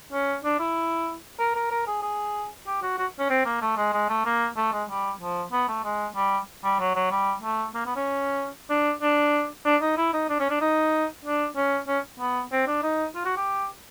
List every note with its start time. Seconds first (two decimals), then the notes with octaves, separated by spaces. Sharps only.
0.13 C#4
0.44 D4
0.59 E4
1.40 A#4
1.55 A#4
1.71 A#4
1.87 G#4
2.03 G#4
2.67 G4
2.82 F#4
2.98 F#4
3.19 C#4
3.30 C4
3.46 A#3
3.61 A3
3.77 G#3
3.93 G#3
4.09 A3
4.25 A#3
4.57 A3
4.73 G#3
4.89 G3
5.21 F3
5.52 B3
5.68 A3
5.84 G#3
6.16 G3
6.64 G3
6.80 F#3
6.96 F#3
7.11 G3
7.43 A3
7.75 A#3
7.86 B3
7.96 C#4
8.70 D4
9.02 D4
9.65 D4
9.82 D#4
9.97 E4
10.14 D#4
10.29 D4
10.40 C#4
10.50 D4
10.61 D#4
11.25 D4
11.56 C#4
11.88 C#4
12.20 B3
12.52 C4
12.67 D4
12.83 D#4
13.15 F4
13.25 F#4
13.37 G4